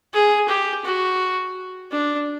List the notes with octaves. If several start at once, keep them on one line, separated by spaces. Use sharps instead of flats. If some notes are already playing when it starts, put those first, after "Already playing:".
G#4
G4
F#4
D4